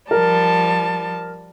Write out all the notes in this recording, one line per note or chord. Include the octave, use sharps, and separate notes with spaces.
F3 G3 A#4 A5